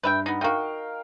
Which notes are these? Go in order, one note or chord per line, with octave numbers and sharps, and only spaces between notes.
G2 B4 E5 G5
B3 D#4
D#4 F#4 A#4 F5 G5